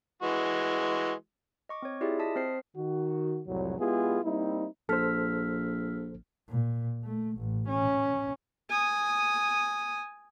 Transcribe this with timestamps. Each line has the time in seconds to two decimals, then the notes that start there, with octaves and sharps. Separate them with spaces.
0.22 E3 G#3 F#4
1.69 D#5 C#6 D6
1.82 C4 C#5
2.01 E4 F4 G4 G#4 D5 E5
2.19 D#5 A5 D#6 B6
2.35 C4 C5 C7
2.76 D#3 F#4
3.47 C2 F2 A2 F#3
3.79 G#3 B3 E4 F4 G4 G#4
4.23 G3 A#3 C4 D#4 E4
4.89 A#1 A4 C5 E6 F6 B6
6.48 A#2
7.04 A3
7.37 A1
7.68 C#4
8.70 G#5 D#6